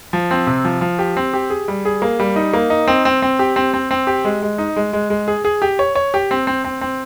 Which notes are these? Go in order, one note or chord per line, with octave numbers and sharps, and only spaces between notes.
F3
C4
C3
F3
F3
G4
C4
G4
G#4
G3
G#4
A#3
G3
D#4
A#3
D#4
C4
C4
C4
G4
C4
C4
C4
G4
G#3
G#3
D#4
G#3
G#3
G#3
G#4
G#4
G4
C#5
C#5
G4
C4
C4
C4
C4